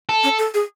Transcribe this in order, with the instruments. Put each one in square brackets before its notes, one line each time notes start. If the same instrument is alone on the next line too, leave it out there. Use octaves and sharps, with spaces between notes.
[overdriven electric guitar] A4
[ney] C#4
A4
G#4